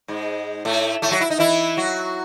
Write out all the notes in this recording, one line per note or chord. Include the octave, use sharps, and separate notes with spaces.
G#2 G#3
A2 A3
A2 A3
F#3 F#4
E4
D#4
E3 E4
F#3 F#4